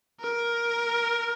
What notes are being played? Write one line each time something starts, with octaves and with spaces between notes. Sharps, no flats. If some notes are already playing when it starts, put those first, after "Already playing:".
A#4